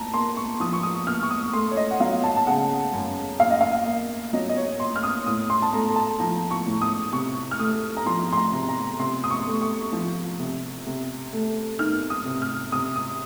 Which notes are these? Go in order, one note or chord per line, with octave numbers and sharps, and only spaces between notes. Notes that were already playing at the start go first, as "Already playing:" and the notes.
Already playing: A#2 A5 A#5
A#3 C6
C#6
F3 D#6
C#6
D#6
A#2 F6
C#6
D#6
A3 C6
C#5
D#5
F#5
F#3 F5
A5
A5
C#3 F#5
F#2
A#2 F5
D#5
F5
A#3
F#3 D#5
D#5
C#5
A#2 C6
F6
D#6
A2 D#6
C6
A5
A3 A#5
A5
F3 A#5
C#6
A2
D#6
C3 C#6
F6
A3 D#6
A#5
F3 C6
C6
A#5
C3
A#5
C3 C6
D#6
C#6
A3
C#6
F3
C3
C3
A3
D#3 F6
D#6
C3
F6
C3 D#6
D#6